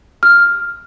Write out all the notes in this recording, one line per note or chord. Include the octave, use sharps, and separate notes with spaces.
F6